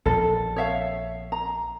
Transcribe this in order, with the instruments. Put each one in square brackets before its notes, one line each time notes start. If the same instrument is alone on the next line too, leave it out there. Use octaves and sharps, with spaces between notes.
[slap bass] A#1 [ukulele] A4
[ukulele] C#5 E5 F5
A#5